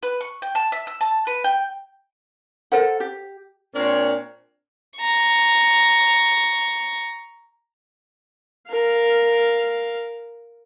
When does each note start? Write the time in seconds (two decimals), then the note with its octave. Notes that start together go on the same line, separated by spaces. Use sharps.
0.03 B4
0.21 C#6
0.42 G5
0.55 A5
0.72 E5
0.87 E6
1.01 A5
1.27 B4
1.44 G5
2.72 A4 A#4 C5 F#5
3.00 G4
3.75 A#2 C4 D4 A#4 C#5
5.00 A#5 C#6
8.70 A#4 F5